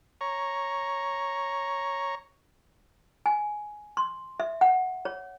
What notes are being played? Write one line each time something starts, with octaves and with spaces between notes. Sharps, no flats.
C#5 A#5 C#6
G#5
C6
E5
F#5
C#5